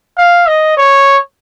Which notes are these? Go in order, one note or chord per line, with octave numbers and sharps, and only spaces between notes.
F5
D#5
C#5